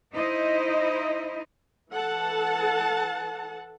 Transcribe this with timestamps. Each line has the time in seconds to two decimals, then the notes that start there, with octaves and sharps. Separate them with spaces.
0.13 D#4 E4 C5 D#5
1.92 E3 A4 F#5 A5